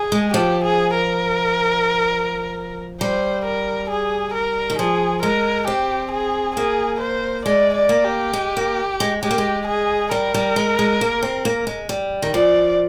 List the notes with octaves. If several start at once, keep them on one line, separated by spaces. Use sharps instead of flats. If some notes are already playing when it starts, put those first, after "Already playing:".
Already playing: G#4
G#3
F3 G4
G#4
A#4
G3 C5
A#4
G#4
A#4
D#3
F3 G#4
G#3 A#4
C4 G4
G#4
A#3 G#4
C5
G#3 D5
D5
A#3
G4
G#3
A#3
G#3
G#3 G4
A#3
G#3
G#4
G3 A#4
G3
G#3
G#3
A#3
C4
A#3
G#3
G3
D#3
F3 D5